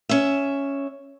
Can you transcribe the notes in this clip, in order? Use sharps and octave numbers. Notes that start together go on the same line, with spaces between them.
C#4 E5